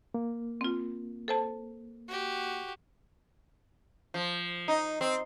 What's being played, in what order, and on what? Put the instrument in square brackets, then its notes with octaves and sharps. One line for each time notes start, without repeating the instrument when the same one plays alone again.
[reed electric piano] A#3
[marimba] C4 F4
A4 C5 A5
[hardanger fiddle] F#4 G4
[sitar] F3
D#4
C4